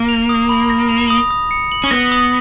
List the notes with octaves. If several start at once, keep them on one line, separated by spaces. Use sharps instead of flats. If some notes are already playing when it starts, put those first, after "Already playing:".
Already playing: A#3
F7
D#6
B5
A#6
F7
D#6
D#6
C#7
F#7
C#4
B3 A#6
D#6